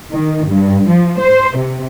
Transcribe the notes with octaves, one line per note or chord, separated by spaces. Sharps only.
D#3
G2
F3
C5
C3